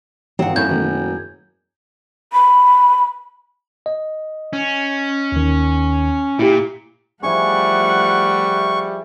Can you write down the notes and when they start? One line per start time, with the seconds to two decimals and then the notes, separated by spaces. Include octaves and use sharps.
0.39 G#1 C4 F#5
0.56 F#2 A2 G6 G#6
0.68 F#1 B2 D#3 A3
2.33 B5
3.86 D#5
4.53 C#4
5.32 D#2 D#3
6.39 A#2 E4 G4
7.23 F3 G3 A3 E4 G#4 F#5 C#6